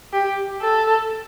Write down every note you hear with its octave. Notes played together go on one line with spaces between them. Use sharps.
G4
A4